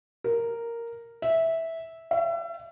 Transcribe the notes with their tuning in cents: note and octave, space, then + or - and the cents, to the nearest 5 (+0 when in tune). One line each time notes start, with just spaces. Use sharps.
A#4 -5
E5 -10
E5 +35